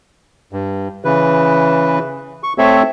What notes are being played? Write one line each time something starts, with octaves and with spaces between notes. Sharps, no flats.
G2
C#3 E3 B4
C#6
A3 C4 A4 C#5 E5